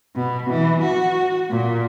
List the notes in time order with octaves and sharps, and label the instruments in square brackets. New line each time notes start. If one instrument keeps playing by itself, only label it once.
[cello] B2
E3
F#4
A#2